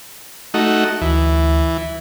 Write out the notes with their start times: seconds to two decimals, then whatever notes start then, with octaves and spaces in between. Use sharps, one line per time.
0.54 A3 D#4 F#4
1.01 D2 E3